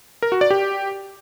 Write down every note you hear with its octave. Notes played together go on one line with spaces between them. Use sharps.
A#4
F#4
D5
G4